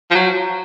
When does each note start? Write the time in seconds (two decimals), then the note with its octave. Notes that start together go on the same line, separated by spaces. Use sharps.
0.11 F3
0.15 F#3